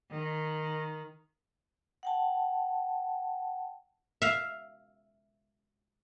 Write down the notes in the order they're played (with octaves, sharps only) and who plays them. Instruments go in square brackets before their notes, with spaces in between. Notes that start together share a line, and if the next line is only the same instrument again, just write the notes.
[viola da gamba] D#3
[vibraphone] F#5 G5 A5
[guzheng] E5 F5